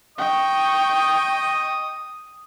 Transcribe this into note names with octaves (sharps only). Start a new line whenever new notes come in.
D#5 G5 C#6 D#6